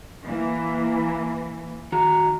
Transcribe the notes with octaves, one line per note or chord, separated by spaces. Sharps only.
E3 A#3
D#3 F#4 A#5